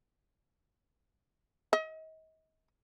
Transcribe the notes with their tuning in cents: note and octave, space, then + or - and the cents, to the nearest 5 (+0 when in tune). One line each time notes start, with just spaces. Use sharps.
D#5 +35